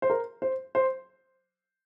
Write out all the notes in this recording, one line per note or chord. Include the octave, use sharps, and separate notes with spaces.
C5
A#4
C5
C5